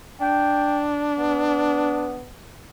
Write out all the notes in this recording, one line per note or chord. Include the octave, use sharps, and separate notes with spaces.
D4 G5
B3